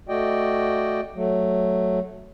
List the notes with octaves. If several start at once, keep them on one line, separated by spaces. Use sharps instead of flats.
A3 F#4 D5 D#5 G5
F#3 A3